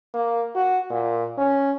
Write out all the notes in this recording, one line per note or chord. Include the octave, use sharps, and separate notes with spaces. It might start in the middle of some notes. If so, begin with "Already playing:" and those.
A#3
F#4
A#2
C#4